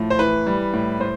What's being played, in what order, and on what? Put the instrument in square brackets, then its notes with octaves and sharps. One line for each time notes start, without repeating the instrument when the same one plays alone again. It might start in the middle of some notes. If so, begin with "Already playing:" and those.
Already playing: [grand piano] A2 F3
C5
E3 B4
G3
A2
A2 C5